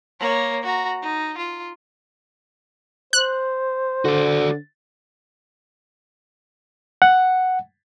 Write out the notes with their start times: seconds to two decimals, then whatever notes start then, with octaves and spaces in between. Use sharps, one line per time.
0.20 A#3 C#5
0.63 F#4 A#5
1.02 D#4
1.38 F4
3.13 C5 F#6
4.05 D3 F#4 D5
7.02 F#5